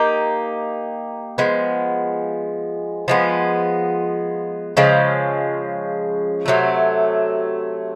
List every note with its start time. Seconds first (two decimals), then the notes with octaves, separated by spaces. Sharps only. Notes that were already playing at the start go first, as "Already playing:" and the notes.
Already playing: A#3 D#4 G4
1.38 F3 G#3 B3
3.08 F3 G#3 B3
4.77 C#3 F3 G#3
6.46 C3 D#3 F#3 A3